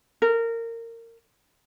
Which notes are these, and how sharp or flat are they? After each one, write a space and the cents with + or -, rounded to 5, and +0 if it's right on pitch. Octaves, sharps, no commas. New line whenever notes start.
A#4 -20